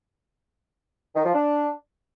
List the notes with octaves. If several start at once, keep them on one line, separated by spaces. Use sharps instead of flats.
D#3
F3
D4